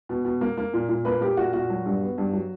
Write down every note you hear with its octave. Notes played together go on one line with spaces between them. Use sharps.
B2
B2
A#3
A#3
A#2
A#2
A#3 B4
A#3 G4
A#2 F#4
A#2 F#4
F#3
G2
B3
G2
F#3